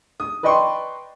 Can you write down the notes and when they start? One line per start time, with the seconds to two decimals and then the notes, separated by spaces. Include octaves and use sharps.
0.20 D#6
0.43 B4 D5 D#5 G5 C6 C#6